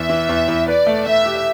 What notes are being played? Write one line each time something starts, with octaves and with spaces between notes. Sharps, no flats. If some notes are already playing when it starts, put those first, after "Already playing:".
Already playing: E2 E5
E3
E2
E2
B4 D5
A3
A3 E5
G4